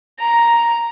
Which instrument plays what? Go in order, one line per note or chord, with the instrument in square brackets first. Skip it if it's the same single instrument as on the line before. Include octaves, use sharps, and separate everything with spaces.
[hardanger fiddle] A#5